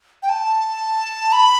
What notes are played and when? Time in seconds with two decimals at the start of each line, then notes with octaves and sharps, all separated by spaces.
0.23 G5
0.29 A5
1.32 B5